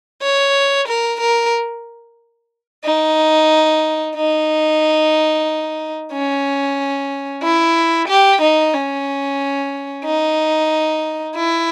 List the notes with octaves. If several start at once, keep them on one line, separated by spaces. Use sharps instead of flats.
C#5
A#4
A#4
D#4
D#4
C#4
E4
G4
D#4
C#4
D#4
E4